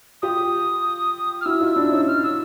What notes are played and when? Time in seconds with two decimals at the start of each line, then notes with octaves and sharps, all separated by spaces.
0.22 F4 G4 D#6
1.41 F6
1.46 E4 F#4 E6
1.61 D#4 F4
1.76 D4 E4
1.91 C#4 D#4
2.07 F6
2.23 E6